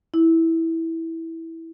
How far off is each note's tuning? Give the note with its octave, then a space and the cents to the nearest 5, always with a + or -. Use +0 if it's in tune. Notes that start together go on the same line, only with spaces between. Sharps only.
E4 -10